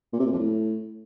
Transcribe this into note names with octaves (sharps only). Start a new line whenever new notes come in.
A#2
C3
A#2
F2
A2